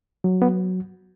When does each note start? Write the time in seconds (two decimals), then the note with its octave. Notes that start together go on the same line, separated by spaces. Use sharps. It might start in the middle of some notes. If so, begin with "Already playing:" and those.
0.24 F#3
0.42 B3